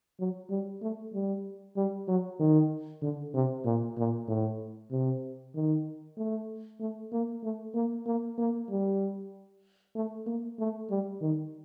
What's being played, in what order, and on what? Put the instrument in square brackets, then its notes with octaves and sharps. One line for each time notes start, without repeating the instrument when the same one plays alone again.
[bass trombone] F#3
G3
A3
G3
G3
F#3
D#3
D3
C3
A#2
A#2
A2
C3
D#3
A3
A3
A#3
A3
A#3
A#3
A#3
G3
A3
A#3
A3
G3
D#3